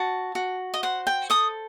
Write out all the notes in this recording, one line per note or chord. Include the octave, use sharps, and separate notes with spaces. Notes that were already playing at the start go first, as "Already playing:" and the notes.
Already playing: F#4 A5
F#4
D#5
C5 F#5
G5
A4 D#6